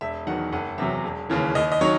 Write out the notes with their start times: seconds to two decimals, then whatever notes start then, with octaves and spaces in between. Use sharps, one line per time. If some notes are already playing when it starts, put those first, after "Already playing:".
0.01 E1 E5
0.27 E2 D#3 F#3 F#5
0.52 F#1 F#5
0.78 E2 C3 F#3 E5
1.04 E1
1.30 D#2 C#3 E3
1.55 D#2 D#5
1.72 D#5
1.81 D#3 F#3 C#5